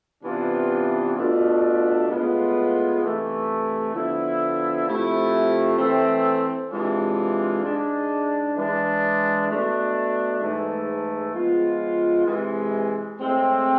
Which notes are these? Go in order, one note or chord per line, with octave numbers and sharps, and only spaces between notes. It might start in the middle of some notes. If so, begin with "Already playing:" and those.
C3 E3 B3 D4 F4
B2 A3 D4 F4
A2 G#3 B3 F4
C3 E3 A3
D3 F3 B3 E4
C3 F3 A3 E4
E3 A3 C4
C3 E3 G#3 D4 F4
G#2 G#3 D4
E3 G#3 D4
B2 A3 D4
G#2 E3 A3
F3 G#3 B3 F4
C3 E3 G#3
A2 G#3 C4